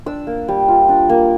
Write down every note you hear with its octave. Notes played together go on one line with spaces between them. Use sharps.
D4 E6
A#3
G3
F4
D4
A#3